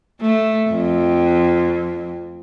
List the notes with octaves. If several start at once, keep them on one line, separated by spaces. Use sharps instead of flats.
A3
F2